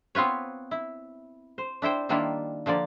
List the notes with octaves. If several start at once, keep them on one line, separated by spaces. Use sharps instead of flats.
B3 C4 F4 B4 C#5
E4
C5
D4 E4 C5 G5
D#3 G3 A#3 D4 E4 F4
D3 F3 A#3 D5